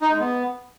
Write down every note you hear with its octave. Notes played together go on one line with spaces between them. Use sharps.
D#4
G#3
B3